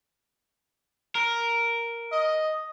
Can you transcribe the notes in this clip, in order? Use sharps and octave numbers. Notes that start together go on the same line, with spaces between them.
A#4
D#5